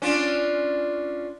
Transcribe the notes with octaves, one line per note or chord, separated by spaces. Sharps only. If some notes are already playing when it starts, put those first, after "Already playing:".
C#4 D4 F4